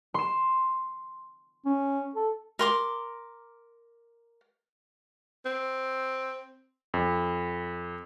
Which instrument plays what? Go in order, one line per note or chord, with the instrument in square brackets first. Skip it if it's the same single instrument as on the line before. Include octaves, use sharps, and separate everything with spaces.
[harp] C6 E7
[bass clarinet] C#4
A4
[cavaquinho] A#4 C6 D6
[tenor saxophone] C4
[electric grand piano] F2